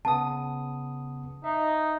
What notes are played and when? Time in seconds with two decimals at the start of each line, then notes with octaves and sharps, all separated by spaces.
0.05 C#3 B3 A5 D#6
1.44 D#4 E5